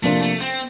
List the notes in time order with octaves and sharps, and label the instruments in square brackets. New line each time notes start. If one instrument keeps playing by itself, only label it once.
[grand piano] C3 F3 A#3 D4 F4 [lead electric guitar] A3
[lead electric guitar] A3
C4